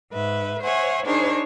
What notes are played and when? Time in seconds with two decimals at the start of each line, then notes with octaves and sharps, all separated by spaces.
0.11 G#2 B4 E5
0.61 C5 C#5 E5 F#5 G#5
1.05 D4 D#4 G#4 A#4 C5 C#5